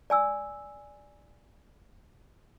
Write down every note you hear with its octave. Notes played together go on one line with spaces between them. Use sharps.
D5 G#5 E6